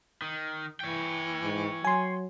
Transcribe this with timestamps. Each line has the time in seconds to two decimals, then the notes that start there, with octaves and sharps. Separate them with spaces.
0.22 D#3
0.80 E3 C#5 G5
1.43 G#2
1.85 F#3 G#5 C6